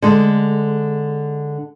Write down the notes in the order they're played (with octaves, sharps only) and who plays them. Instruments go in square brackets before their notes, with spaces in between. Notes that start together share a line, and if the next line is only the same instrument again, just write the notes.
[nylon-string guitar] D3 G#3